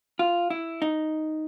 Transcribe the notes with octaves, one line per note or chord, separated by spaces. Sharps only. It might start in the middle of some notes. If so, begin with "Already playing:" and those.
F4
E4
D#4